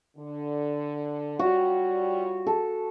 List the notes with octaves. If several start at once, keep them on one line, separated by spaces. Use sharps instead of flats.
D3
G3 F4 F#4 C#5
A4